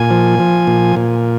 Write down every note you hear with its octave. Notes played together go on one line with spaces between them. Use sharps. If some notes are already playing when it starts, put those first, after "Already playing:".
Already playing: A#2 G#5
F3
F3
A#2
A#2